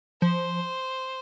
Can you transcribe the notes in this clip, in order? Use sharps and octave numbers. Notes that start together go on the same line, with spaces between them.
F3 C5